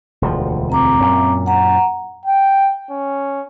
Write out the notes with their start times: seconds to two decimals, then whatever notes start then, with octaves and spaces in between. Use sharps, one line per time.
0.22 E1 D2 F3
0.70 C4 A#5 D6
1.00 F#2 A#2
1.46 F#5 A#5
2.25 G5
2.90 C#4